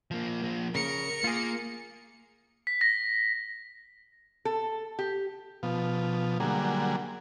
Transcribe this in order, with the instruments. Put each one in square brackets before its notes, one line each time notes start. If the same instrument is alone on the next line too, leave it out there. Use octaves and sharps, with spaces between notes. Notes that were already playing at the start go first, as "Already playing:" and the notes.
[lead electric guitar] F3 A#3
F3 A#3
[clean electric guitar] C#3 [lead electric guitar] A#4 [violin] C#7
[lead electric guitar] A#3 [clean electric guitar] F4 G#4
[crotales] B6
A#6
[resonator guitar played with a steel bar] A4
G4
[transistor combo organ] B2 F3
D3 F#3 G3 A#3 G#4